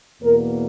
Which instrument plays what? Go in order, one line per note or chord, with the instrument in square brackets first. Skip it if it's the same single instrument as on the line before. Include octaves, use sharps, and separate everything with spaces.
[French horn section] E2 B2 A#3 A#4